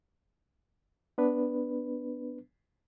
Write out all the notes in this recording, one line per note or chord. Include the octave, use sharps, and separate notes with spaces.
B3 D4 B4